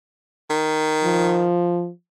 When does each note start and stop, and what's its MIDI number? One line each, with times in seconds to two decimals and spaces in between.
0.50 1.48 51
1.04 1.90 53